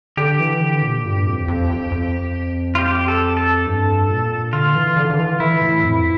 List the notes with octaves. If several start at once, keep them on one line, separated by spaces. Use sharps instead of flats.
D3 G4
E3
D3
A#2
G2
F2
F2
F2
F2
F4
G4
A4
A4
G2
A#2
D3 F4
E3
D3
D3
E3
E3 E4
A2
F2